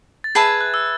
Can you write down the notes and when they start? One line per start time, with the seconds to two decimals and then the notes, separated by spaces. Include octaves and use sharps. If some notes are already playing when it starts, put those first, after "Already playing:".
0.24 A6
0.35 G#4 B4 E5 A5 G#6
0.48 G#6
0.61 F#6
0.74 E6